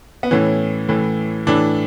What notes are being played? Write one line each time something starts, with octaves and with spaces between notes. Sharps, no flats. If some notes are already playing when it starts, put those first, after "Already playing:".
B3
A2 E3 C#4
A2 E3
A2 E3 D4